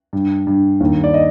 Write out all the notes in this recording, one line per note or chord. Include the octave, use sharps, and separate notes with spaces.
G2
G2
D#2
D5
D#5